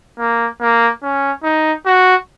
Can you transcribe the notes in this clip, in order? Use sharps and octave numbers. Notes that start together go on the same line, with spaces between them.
A#3
A#3
C#4
D#4
F#4